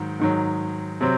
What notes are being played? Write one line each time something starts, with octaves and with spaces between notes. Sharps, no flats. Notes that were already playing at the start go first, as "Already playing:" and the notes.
Already playing: G#2 D#3 F#3
G#2 D#3 F#3
C3 F#3 C4